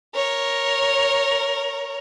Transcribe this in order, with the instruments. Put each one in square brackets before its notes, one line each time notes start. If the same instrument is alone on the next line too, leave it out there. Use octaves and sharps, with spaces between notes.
[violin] A#4 C#5